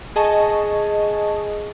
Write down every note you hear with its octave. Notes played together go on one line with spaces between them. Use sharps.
G#4 D#5 A5 C#6